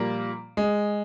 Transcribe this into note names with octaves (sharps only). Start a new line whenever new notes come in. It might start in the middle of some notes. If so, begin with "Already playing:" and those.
Already playing: A#2 F3 G3 A#3
G#3